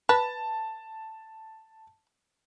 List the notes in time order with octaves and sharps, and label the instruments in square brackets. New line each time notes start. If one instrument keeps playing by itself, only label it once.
[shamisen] B4 [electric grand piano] A5